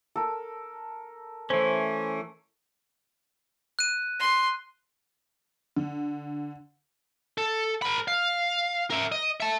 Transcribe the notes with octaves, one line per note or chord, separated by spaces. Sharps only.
A4 A#4
E3 A3 C#4 C5
F#6 D#7
C6
D3
A4
A#4 B5
F5
A#4 E5
D#5
E5 A5